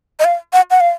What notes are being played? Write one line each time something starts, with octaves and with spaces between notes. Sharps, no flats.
D#5
F5
F#5
F#5
F5